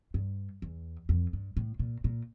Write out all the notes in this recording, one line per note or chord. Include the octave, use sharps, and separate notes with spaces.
G2
E2
F2
G2
A2
A#2
A#2